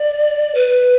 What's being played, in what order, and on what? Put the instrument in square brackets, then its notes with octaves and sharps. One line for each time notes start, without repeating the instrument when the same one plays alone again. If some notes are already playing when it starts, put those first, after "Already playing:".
Already playing: [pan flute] D5
B4